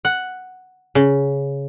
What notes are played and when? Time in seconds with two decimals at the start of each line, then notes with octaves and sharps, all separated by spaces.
0.05 F#5
0.95 C#3